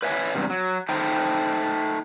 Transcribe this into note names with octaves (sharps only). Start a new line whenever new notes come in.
B4 C#5 E5 G#5
E2 G2 C3
F#3
A3 D#4 C5 G5